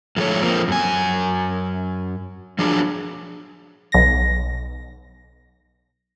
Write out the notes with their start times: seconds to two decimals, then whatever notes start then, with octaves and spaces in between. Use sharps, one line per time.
0.17 A2 F3 G#3 A4 C#5
0.42 F3 A#3 C4
0.68 F#2 G#5
2.59 F3 F#3 D4 G#4
3.92 B1 A#6